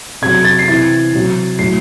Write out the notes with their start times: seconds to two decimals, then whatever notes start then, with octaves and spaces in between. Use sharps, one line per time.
0.22 C3 G#6
0.26 F#3
0.35 G#6
0.45 A6
0.59 C7
0.68 C3 E3 A6
1.14 C3 F#3
1.59 A2 F#3 C7